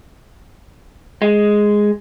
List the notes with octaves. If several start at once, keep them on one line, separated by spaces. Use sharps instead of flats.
G#3